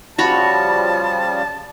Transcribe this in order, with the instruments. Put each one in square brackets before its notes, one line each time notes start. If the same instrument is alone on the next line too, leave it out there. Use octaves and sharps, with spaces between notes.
[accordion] C#3 F3 G3 [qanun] F#4 C#5 B5 [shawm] A5